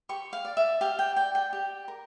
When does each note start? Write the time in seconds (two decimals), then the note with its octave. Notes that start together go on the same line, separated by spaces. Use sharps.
0.09 G4 C#6
0.33 F5
0.45 D5
0.57 E5
0.81 G4 F5
0.99 G5
1.16 D5 G5
1.35 G5
1.53 G4
1.88 A#4